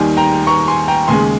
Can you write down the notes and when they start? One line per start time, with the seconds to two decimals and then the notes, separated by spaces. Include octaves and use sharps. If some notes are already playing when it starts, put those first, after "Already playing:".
Already playing: D#2 D#3 G3 G#5 C6
0.17 G5 A#5
0.47 A#5 C#6
0.68 G#5 C6
0.88 G5 A#5
1.08 D#2 C#3 G#3 G#5 C6